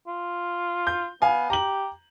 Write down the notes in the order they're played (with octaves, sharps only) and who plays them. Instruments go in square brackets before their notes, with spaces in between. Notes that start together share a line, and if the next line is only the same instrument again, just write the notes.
[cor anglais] F4
[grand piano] G6
[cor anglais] B3 [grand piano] F5 G#5
[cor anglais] G4 [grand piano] A#5 F#7